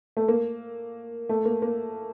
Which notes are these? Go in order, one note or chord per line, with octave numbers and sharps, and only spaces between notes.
A3
A#3
A3
A#3
A#3